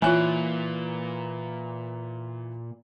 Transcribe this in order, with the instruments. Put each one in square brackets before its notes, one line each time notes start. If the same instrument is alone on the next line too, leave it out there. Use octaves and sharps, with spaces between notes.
[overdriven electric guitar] A#2 [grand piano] E3 F#6 [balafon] F4 C#5 G#5